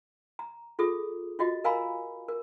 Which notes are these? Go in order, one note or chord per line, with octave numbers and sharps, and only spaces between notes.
A#5
F4 G#4 A4 D#6
F4 F#4 D#5
A#4 F5 G#5 A#5 B5
A#4